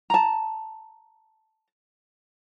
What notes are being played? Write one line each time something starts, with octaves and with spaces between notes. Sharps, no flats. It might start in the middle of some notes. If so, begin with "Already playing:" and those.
A5 A#5